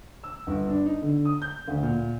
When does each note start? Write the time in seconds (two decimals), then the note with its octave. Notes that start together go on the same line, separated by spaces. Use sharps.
0.24 E6
0.47 G1
0.69 D4
0.86 D#4
1.02 D3
1.25 D#6
1.42 G6
1.68 D2
1.82 A#2